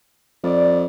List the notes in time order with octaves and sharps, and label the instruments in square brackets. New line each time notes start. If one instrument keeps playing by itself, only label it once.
[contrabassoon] F2 [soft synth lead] D5